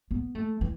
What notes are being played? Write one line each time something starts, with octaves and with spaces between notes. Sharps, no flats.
B3
A3
E3